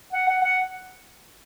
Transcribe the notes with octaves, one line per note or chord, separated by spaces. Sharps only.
F#5
F#5
F#5